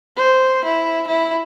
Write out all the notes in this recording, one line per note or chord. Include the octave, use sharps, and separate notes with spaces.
C5
E4
E4